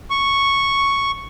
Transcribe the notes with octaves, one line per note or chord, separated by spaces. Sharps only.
C#6